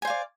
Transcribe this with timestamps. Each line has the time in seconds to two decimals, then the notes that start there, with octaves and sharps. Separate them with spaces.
0.02 G#5
0.05 C5
0.07 F5
0.10 D5